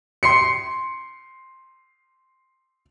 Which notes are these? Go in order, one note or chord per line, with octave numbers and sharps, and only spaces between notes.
C6 C7 C#7